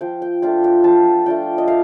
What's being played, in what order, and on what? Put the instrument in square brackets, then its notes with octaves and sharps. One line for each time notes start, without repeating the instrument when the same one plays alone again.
[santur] F3 G5
G5
A3 D4 F4 G5
G5
F3 A5
A3 D4 F4 G5
D#5
A3 F5